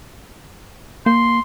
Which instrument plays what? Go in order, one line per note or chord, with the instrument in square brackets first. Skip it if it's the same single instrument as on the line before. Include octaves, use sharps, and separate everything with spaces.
[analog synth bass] A#3 [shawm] C6